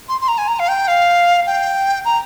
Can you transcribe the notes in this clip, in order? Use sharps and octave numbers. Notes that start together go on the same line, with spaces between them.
C6
C6
A#5
G#5
A#5
F5
G5
F5
G5
A#5